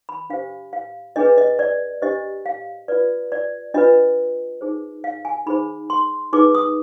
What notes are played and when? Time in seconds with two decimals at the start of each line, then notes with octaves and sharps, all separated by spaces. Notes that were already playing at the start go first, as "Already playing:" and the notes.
0.09 B5
0.30 D4 G4 C5 F5
0.73 F5
1.16 D4 G#4 B4 D#5
1.38 D#5
1.59 D5
2.02 D4 G4 C5 D#5
2.46 F5
2.88 F4 B4 D5
3.32 D5
3.74 D4 F4 B4 D#5
4.61 D#4 G#4 C5
5.04 F5
5.25 G#5
5.46 D#4 G#4 C5 B5
5.90 C6
6.33 D#4 G#4 B4 D6
6.55 D#6